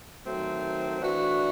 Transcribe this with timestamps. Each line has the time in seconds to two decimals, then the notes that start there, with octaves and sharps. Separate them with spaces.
0.24 D#3 F#3 A3 C4
1.01 E3 A3 D4 F#4